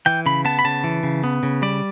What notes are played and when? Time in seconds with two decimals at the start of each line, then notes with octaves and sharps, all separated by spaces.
0.06 E3 G5
0.26 C#3 B5
0.45 B3 A5
0.59 B5
0.64 C#3 A5
0.84 E3
1.03 C#3
1.24 B3
1.43 C#3
1.62 G3 D5